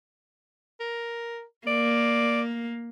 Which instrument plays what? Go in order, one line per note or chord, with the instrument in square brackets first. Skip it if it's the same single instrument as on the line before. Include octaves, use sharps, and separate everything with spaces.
[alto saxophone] A#4
[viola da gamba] A#3 [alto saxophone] D5